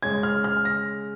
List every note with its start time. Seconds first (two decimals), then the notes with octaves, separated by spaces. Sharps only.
0.03 C#3 G#3 C#4 G#6
0.23 F6
0.44 F6
0.65 A#6